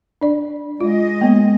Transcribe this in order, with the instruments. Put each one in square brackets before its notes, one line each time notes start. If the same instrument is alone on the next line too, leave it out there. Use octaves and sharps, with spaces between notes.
[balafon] D4 D5
[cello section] G#3 D#5 [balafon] F4
[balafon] A#3 B3